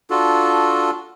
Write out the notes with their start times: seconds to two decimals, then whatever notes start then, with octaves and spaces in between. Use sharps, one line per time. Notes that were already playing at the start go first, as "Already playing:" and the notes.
0.10 D4 F4 F#4 A4